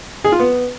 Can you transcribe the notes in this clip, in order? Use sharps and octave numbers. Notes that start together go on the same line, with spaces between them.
G#4
F4
B3